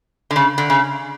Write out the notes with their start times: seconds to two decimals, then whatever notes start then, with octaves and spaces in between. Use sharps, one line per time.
0.31 D3
0.36 C#3
0.58 D3
0.70 C#3